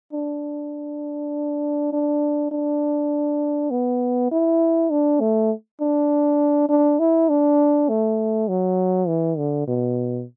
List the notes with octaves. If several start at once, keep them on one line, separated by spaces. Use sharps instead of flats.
D4
D4
D4
B3
E4
D4
A3
D4
D4
E4
D4
A3
F#3
E3
D3
B2